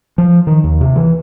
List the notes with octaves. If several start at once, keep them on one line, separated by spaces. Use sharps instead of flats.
F3
D#3
D#2
C3
E3